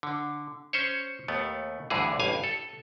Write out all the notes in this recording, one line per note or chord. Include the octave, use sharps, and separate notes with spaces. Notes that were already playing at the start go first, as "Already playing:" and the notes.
D3
C#4 C5 C#5
D#2 A3 B3
D2 G2 D3 E3 G#4
A1 G2 F5 G#5
A4